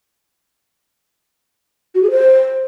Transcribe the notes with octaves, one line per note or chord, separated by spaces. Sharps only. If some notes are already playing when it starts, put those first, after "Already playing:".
F#4
G#4
C5